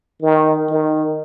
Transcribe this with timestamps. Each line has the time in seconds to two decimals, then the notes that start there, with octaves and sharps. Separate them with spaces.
0.22 D#3
0.70 D#3